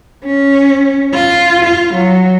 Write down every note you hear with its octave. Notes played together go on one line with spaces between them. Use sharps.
C#4
F4
F4
F#3